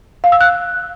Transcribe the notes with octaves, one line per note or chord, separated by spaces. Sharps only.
F5
E6
F#6